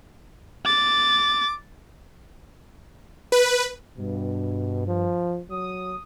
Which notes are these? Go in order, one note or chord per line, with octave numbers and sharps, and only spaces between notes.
D6 A6
B4
G2 B2
F3
F#3 D#6